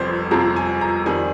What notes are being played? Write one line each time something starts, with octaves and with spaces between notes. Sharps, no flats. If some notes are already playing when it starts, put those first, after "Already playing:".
Already playing: G1 F2 C3 F3 C5
G1 F2 C3 F3 A#5
G#5
A#5
F2 D#3 G3 G#5